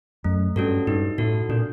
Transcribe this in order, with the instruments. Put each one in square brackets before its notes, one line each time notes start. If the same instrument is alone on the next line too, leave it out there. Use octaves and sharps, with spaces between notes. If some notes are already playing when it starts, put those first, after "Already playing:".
[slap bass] F#2 [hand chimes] A3
[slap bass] G2 [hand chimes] C#4 F#4 A4
[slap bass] G2 [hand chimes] D#4
[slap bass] A2 [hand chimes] F#4 A4
[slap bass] A#2 [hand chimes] D4